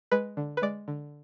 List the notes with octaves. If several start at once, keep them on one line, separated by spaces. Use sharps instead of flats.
G#3 B4
D3
B4
G#3 D5
D3